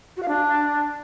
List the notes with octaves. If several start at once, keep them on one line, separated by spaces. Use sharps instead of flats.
F#4
F5
D4